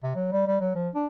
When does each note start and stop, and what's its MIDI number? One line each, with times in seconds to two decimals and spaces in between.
0.04 0.11 48
0.15 0.32 54
0.32 0.46 55
0.47 0.60 55
0.60 0.73 54
0.75 0.89 53
0.95 1.06 62